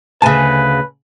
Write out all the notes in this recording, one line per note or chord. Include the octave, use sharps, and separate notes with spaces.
D2 C#3 B4 G#5 A5